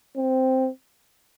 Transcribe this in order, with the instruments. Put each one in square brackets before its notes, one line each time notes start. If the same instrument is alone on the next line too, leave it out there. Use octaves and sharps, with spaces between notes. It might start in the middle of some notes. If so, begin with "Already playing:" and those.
[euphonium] C4